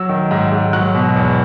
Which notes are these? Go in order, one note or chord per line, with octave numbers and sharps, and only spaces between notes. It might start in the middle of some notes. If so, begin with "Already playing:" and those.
Already playing: F#3 E6
D#3
G#2
G#2
F#3 F#6
B2
E2